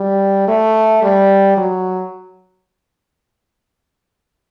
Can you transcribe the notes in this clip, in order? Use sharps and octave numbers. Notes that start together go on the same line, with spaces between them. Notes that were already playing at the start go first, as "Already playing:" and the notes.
Already playing: G3
A3
G3
F#3